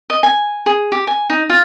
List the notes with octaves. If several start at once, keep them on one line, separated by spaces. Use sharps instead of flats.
D#5
G#5
G#4
G4
G#5
D#4
F4